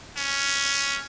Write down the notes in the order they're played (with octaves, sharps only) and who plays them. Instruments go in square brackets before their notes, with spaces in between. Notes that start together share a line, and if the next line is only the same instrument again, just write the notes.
[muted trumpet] C#4